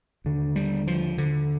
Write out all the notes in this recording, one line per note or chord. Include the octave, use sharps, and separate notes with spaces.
D#2 D3
G3
F3
D3